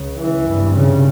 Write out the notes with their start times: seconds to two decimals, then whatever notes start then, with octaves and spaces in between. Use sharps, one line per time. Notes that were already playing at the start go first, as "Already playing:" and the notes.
Already playing: C#2 C#3
0.16 E3
0.45 G#1 G2
0.73 C#3